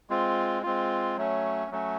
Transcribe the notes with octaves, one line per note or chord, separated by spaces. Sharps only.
G#3 C4 F4
G#3 C4 F4
F#3 A3 C#4
F#3 A3 C#4